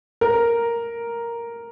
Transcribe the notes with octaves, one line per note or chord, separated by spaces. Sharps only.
A#4